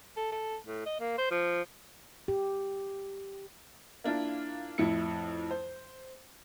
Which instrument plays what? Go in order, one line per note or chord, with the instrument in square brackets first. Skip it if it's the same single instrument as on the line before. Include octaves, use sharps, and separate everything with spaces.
[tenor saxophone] A4
A4
A2
D#5
A#3
C5
F3
[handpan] G4
[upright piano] A#3 D4 E4 F4
F2 A2 E4 C#7
C5